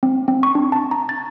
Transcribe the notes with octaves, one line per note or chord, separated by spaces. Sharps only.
C4
C4
C#6
D4
A5
A#5
A6